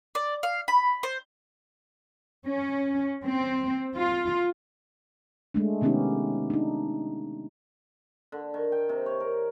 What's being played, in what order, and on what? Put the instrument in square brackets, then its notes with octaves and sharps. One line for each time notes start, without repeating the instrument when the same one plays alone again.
[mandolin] D5
F5
B5
C5
[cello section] C#4
C4
F4
[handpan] G#3 A3 D4
C3 D#3 B3 C#4 D#4 G4
D4 D#4
[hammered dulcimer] D3
D#3
G5
C3
C#5
A#4